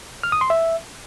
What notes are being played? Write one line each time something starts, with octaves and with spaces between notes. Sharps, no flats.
F6
D#6
C6
E5